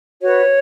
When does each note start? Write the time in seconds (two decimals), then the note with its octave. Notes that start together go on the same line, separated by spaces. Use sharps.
0.21 F#4 B4 C#5